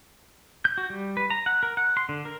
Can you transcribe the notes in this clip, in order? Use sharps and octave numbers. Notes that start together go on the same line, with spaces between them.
G6
F#4
G3
B4
A#5
F#5
A#4
F#5
C6
D3
A#4